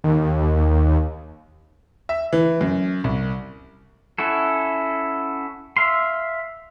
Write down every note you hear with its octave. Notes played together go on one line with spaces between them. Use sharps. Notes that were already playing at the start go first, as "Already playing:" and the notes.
D#2
E5
E3
F#2
C2
C#4 E4 F#4 A4
E5 F5 C6